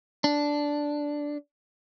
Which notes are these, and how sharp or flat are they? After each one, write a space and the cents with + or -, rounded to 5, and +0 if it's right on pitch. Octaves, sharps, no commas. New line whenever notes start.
D4 -5